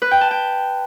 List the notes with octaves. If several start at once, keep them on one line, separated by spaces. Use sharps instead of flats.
B4
G5
A5
G5